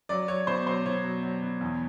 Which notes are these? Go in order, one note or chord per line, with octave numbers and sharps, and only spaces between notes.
F#3 D5
F#3 C#5
B2 C5
F#3 C5
B2 C#5
F#3
F#3
B2
E2